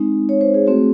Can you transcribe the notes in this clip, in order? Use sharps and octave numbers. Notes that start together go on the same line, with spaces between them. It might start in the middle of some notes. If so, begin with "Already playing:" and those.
Already playing: G#3 C4 D#4
C#5
C5
G#4
A3 C4 F#4